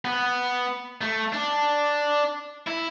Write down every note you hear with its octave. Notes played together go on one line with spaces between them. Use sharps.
B3
A3
D4
E4